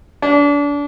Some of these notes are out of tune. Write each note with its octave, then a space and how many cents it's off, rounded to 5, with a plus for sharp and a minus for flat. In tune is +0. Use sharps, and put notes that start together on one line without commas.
D4 -30